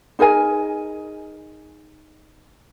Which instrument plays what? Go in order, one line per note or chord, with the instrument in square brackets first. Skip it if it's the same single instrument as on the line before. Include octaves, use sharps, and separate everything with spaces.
[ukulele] D#4 G#4 A#4 G#5